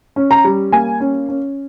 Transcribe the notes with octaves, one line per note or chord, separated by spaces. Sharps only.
C#4
A#5
G3
A#3 G#5
C#4
C#4